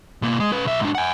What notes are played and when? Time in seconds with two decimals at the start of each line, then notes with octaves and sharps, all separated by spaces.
0.22 B2 A#3
0.40 G#3
0.52 C#4 B4
0.65 B1 E5
0.81 G#2 D4
0.95 F#5 G#5